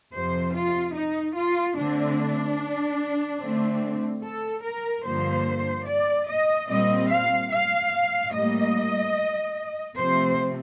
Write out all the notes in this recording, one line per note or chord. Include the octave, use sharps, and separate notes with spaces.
F2 C3 F3 C5
F4
D#4
F4
D3 A3 C4 D4
D3 A3 C4
A4
A#4
G2 D3 F3 A#3 C5
D5
D#5
A#2 G3 C4 D#5
F5
F5
A2 G3 A#3 D#5
C3 F3 A3 C4 C5